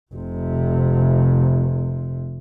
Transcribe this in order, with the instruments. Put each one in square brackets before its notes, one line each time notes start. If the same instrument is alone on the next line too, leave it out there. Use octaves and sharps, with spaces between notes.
[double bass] F1 C3